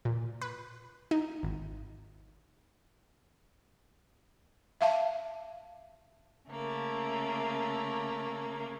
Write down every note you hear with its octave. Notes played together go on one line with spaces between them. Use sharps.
A#2
B4
D#4
G#1
E5 F5 A5
C#3 A3 A#3